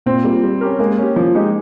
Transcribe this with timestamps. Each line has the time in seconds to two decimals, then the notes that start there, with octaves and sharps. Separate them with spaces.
0.06 A#2 C4
0.24 G3 A#3 F4
0.43 G3
0.61 C#4 G4 A#4
0.79 G#3 A#3
0.98 C#4 G4
1.16 F3
1.35 G#3 D#4 G4